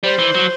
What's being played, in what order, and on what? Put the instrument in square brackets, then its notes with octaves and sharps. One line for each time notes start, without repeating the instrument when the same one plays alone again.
[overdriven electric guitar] G3 [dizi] C5
[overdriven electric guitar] E3
F#3